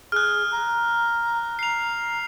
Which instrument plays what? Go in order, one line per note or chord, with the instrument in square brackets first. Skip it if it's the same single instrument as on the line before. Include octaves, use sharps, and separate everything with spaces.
[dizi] G#4 [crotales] F6 F#6
[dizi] A#5
[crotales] C7 F7